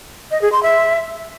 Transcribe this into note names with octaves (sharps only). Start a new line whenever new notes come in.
D#5
G#4
C6
E5